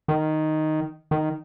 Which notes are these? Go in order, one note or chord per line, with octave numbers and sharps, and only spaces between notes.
D#3
D#3